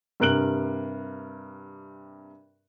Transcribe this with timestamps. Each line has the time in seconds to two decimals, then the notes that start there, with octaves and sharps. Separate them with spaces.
0.20 G2 C3 A#4 F#6 D7 F#7